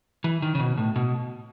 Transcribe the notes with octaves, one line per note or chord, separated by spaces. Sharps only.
E3
D#3
C#3
B2
A2
B2